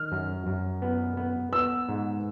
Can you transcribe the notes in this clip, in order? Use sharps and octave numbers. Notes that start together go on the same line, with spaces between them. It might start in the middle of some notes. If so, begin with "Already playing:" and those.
Already playing: D#3 F6
F#2
F#2
B3
B3
B3 E6
G#2